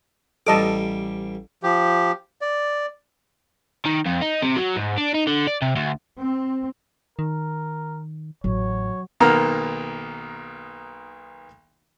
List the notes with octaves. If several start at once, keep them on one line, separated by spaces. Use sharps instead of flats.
A1 G3 A4 D#5 A5 D6
F3 G4
D5
D#3
F2
D#4
C3
F#3
G#2
D4
D#4
D3
D5
C3
D2
C4
D#3 A#4
A1 F#3 C#5
B1 D#3 A#3 B3 A#5 F6